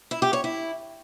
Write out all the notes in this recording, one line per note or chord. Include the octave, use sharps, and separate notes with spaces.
E4
G4
C#5
E4